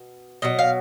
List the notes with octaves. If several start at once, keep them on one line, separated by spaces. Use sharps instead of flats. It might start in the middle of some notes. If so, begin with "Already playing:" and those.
Already playing: B2
B2 F#3 D#5
F5